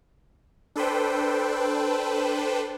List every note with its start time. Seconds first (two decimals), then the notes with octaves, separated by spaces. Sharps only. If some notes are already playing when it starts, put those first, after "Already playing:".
0.76 D4 A4 B4 C5 G5